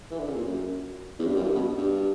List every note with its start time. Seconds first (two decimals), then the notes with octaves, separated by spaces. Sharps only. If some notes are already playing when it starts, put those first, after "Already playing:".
0.11 E3
0.19 D3
0.28 C#3
0.35 A#2
0.45 F#2
1.19 E2
1.27 G2
1.36 F#2
1.44 G2
1.55 B2
1.77 G2